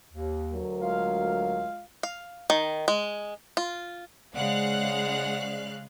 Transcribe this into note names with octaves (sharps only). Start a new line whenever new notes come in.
D#2
D2 F#3 A#4
G#3 F4 F5
F5
D#3
G#3
F4
C#3 G#3 C5 D5 F5 F#5 F#6